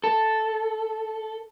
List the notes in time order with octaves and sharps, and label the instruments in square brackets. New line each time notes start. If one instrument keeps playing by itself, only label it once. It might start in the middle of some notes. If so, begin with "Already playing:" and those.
[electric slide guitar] A4